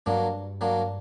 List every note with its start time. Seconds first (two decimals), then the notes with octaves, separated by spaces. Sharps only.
0.06 G2 F#3 A#3 D4
0.61 F#3 A#3 D4